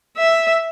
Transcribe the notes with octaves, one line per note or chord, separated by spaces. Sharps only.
E5